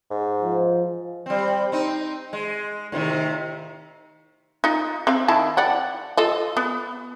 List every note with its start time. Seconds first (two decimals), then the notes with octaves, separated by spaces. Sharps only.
0.10 G#2
0.42 F3
1.26 G3 C4
1.72 C4 D#4
2.33 G#3
2.92 A2 C3 D#3
4.64 D#4 F4
5.07 C4 F5
5.28 D#3 E4 A5
5.57 D5 F#5 G5
6.17 F4 A4 D#5
6.57 B3